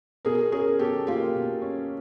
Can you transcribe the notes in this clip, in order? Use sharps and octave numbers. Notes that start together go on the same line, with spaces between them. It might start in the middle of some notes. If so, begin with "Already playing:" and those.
B2 G#4 A#4
C#4 G#4 A#4
B2 G4 A4
A#3 F4 G4
B2
C#4